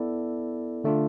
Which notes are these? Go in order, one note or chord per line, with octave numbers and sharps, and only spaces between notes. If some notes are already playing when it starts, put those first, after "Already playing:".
Already playing: B3 E4 A4 D5
D3 A3 D4 F4